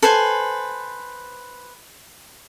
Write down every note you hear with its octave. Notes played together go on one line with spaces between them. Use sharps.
A4 B4 C5 G#5